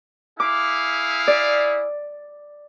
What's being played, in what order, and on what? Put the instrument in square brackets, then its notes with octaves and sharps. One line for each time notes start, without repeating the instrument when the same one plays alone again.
[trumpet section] E4 G#4 F5 [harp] D6
[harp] D5